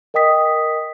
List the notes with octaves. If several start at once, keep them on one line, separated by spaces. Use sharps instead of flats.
A#4 D#5 G5 D#6 B6